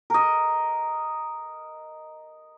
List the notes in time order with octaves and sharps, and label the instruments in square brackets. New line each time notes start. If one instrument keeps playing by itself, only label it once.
[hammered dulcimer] A#4 D#5